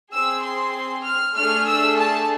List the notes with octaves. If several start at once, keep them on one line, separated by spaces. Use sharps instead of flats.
C4 G#4 E6
C6
F6
A3 D4 G#4 F6
E6
A5